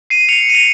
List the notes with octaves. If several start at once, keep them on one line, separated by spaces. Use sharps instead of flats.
C7 D#7
C#7 F7
D#7
C#7 F7